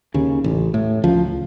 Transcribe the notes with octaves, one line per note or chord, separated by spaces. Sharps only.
D#2 C#3
A1
A2
C#2 F3